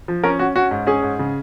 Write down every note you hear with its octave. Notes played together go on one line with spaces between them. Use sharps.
F3
C#4 A#4
C#4 F#4
C#4 F#4
G#2
C#4 G#4
G#2
C#3